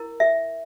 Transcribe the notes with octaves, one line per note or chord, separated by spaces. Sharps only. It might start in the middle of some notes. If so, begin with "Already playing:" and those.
Already playing: E4 A#4
E5